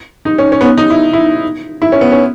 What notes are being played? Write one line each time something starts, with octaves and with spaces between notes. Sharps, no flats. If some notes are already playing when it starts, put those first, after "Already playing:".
D#4
C#4
C#4
B3
C#4
D#4
E4
E4
E4
C#4
B3
C#4